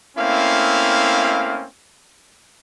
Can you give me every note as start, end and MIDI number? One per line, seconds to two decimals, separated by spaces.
0.17 1.65 57
0.17 1.65 58
0.17 1.65 60
0.17 1.65 61
0.17 1.65 64
0.17 1.65 77